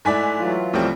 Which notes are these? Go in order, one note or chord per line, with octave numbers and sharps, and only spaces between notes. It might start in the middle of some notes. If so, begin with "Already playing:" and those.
G#2 A3 E4 D5 G#5 B6
E3 F#3 F4
C2 F3 G3 A3 C4